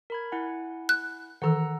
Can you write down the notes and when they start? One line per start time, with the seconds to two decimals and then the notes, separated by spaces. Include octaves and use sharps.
0.10 A#4 B5 G#6
0.32 E4 F#5 G#5
0.89 F#6
1.42 D#3 E3 A4 F#5 A#5 E6